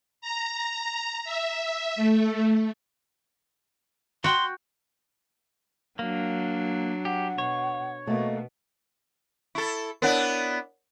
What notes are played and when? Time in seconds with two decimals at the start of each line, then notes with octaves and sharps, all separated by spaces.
0.21 A#5
1.24 E5
1.96 A3
4.24 F#4 G5 C6
5.99 F#3 A#3 D4
7.05 G4 F#5
7.38 B2 C#5
8.07 B2 A3 A#3 D#5
9.55 E4 A4 C#6 A6
10.02 B3 D4 E4 A#4 C#5 F#5